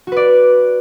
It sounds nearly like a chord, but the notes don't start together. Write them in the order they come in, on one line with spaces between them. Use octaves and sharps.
F#4 B4 D5